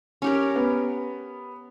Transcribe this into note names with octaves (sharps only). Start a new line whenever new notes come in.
C#4 G4 A#4
B3